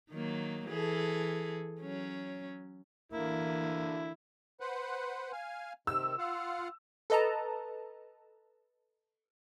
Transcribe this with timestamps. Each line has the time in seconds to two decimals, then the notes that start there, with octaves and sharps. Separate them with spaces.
0.11 D#3 F#3 A#3
0.68 E3 G#4 A4
1.80 F#3 C#4
3.12 D3 E3 A#3 E4
4.60 B4 C5 F#5
5.32 F5 G#5
5.87 C3 D#3 E6
6.18 F4 F5 F#5
7.10 A4 B4 D#5 A5 A#5